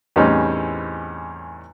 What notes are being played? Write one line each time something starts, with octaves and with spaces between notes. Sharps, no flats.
E2 A2 G3 C4 C#4 D#4